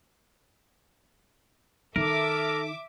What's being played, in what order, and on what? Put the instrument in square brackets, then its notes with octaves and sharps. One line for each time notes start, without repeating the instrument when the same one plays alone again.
[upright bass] D#3 D#4 [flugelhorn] A4 [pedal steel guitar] A#4 [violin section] E5 D6